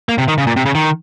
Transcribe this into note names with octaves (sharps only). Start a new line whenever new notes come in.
A#3
C3
D#3
C#3
A#2
C3
C#3
D#3